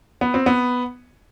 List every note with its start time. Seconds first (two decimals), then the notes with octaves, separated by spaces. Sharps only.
0.21 B3
0.34 C4
0.46 B3